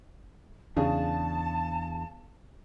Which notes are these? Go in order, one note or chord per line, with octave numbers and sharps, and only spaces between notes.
E2 C#3 D4 G#4 A5